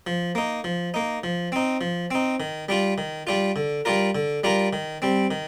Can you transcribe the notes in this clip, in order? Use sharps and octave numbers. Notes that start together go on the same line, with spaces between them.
F3
A#3 D#4
F3
A#3 D#4
F3
C4 D#4
F3
C4 D#4
D#3
G3 D4 F4
D#3
G3 D4 F4
D3
G3 D4 F4 A#4
D3
G3 D4 F4 A#4
D#3
G3 C4
D#3